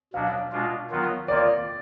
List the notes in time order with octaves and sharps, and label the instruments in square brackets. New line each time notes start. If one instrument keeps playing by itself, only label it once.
[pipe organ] B2 F#3 D4 [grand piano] F5
[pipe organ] B2 G#3 D4 F4
D#3 F#3 B3 F4
[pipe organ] D#3 A#3 F4 [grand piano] D5